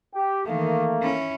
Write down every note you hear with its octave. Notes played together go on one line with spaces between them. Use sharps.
G4
D#3 E3 A3 A#3
C#4 E4